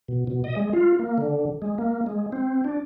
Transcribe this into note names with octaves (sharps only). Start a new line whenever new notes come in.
B2
B2
D#5
G#3
F4
A#3
D3
G#3
A#3
G#3
C4
D4